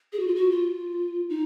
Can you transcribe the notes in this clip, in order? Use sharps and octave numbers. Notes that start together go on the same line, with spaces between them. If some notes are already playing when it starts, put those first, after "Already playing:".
G#4
F#4
F4
F#4
F4
D#4